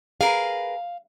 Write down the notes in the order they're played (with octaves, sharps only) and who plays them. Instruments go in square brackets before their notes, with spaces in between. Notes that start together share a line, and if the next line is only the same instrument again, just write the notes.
[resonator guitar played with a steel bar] G#4 A#4 B4 [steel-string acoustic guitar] F5